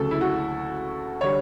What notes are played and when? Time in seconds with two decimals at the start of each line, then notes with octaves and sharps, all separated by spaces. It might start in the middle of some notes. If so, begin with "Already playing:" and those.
Already playing: D2 C#3 F#3 A4
0.11 E4
0.21 F#4
1.21 D3 G3 C#5